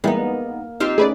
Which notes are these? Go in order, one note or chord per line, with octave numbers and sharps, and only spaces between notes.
E3 G3 G#3 A#3 B3 D#4
C4 D#4 F4 G4 F6
A3 C#4 G#4 B4 D5